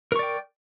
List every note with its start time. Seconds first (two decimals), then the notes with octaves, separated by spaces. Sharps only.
0.12 A#4
0.16 C#6
0.19 D5
0.23 G5